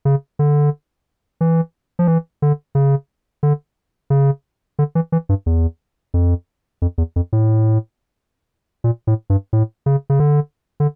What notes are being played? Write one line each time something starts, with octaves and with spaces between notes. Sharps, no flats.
C#3
D3
E3
F3
E3
D3
C#3
D3
C#3
D3
E3
E3
G2
E2
F2
F2
E2
F2
A2
A#2
A2
G2
A2
C#3
C#3
D3
D3